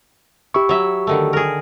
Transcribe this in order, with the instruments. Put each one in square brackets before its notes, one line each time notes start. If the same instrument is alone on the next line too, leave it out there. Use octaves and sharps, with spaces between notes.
[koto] E4 [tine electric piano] G4 C#6
[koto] F#3 E5
D3 D#3 A3
G#4 A#4